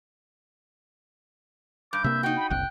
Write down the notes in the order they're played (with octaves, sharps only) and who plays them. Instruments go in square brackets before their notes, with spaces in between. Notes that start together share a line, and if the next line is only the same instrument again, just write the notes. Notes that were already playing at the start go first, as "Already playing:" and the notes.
[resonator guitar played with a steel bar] G2 [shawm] D6 [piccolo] G6
[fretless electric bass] C3 A#3 [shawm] E5
[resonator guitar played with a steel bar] D#4 F#4 [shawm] G5
[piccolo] B5
[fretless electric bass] F#1 C2 [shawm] G5 [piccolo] F#6